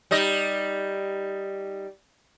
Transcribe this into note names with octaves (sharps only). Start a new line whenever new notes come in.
G3 D#4 D#5